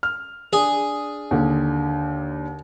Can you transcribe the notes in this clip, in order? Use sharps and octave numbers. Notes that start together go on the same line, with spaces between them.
F6
D4 G#4
D#2 D3